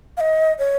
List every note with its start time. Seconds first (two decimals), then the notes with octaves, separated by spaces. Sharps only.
0.17 F5
0.20 D#5
0.59 C#5